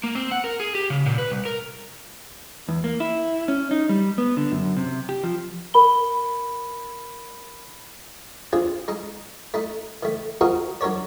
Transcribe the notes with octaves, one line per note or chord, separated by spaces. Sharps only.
A#3
C4
F#5
A#4
G#4
G4
C#3
A#2
B4
C2
A#4
E2
A#3
E4
C#4
D#4
G3
B3
D3
F#2
C3
G4
F3
A#4 B5 G7
C4 D4 F4 G#4
G#3 D#4
A3 D#4
D#3 A3
C4 D#4 F4 F#4 G#4 A#4
F#3 D4 A#4 C#5 D5